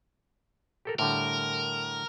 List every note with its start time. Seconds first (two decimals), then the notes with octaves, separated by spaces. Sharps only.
0.85 G4 A4 A#4
0.99 A2 D3 G3 A#4